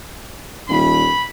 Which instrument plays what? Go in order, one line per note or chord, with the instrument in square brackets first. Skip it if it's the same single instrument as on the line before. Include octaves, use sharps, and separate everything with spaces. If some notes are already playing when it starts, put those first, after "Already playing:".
[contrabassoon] D#1 [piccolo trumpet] B5